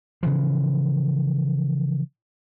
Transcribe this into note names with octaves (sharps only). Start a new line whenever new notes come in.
C#3 E3 F3